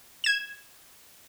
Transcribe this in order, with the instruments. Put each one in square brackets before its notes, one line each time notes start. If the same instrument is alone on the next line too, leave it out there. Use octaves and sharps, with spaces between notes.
[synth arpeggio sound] G#6 E7